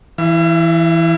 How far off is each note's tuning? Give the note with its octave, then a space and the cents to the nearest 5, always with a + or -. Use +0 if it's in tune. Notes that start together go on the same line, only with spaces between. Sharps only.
E3 +0 E5 +45